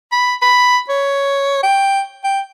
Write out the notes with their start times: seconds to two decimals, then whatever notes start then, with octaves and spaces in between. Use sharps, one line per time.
0.12 B5
0.42 B5
0.89 C#5
1.63 G5
2.24 G5